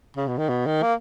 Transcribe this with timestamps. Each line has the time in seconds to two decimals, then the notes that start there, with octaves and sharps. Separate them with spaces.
0.17 C#3
0.28 B2
0.38 D#3
0.49 B2
0.66 D#3
0.83 A#3